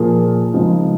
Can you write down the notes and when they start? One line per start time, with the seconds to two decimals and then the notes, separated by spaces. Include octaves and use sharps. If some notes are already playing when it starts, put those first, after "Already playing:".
Already playing: A#2 F3 A#3 F4 G#4
0.53 C#3 F3 G#3 B3 D#4